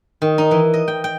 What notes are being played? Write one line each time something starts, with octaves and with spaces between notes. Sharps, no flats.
D#3
D#4
E3
D#5
G5
G5